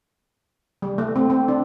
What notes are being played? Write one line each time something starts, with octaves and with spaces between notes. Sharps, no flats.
G3
A3
C4
C4
D4